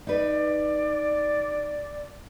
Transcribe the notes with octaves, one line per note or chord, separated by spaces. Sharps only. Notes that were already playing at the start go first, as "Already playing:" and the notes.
D#4 B4 D5